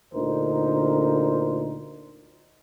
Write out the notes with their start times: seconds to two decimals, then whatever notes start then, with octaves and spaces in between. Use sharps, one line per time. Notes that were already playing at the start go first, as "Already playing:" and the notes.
0.14 D2 A#2 D3 D#4 A#4 C5